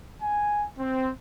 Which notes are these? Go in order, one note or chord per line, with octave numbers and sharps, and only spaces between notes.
G#5
C4